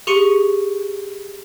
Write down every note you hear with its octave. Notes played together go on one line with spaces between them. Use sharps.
G4 G#4 C6 C#6 C#7 D#7